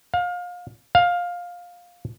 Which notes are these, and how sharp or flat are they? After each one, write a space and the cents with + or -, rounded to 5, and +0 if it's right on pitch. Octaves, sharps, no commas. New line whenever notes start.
F5 +30
F5 +15